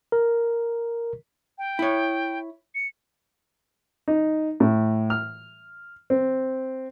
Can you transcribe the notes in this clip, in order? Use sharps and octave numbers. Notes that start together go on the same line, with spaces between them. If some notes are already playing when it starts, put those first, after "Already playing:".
A#4
G5
E4 C#5
C#7
D#4
A2
F6
C4